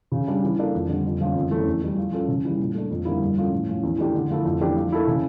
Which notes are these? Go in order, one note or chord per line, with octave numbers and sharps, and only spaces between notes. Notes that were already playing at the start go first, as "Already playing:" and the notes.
C#3
G3 D4
E3
A#3 D4 A4
F2
D3 G3
F2
D3 F3 A#3 C#4
F2
E3 A3 C#4
E2
E3 G3
F3
C#4 F4 A4
C#3
E3 G3
A#2
A3 D4
F2
D3 G3 A#3 E4
G2
F3 C#4 F4 A4
A2
F3 C#4
E2
E3 A3 D4 G4
D3
F3 A3 E4 A4
F2
E3 A3 D4 G4
F3
A#3 E4 A4
C#3